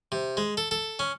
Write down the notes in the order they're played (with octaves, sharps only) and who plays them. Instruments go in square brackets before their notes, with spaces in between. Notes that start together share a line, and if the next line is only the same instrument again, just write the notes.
[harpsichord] C3
G#3
A4
A4
C#4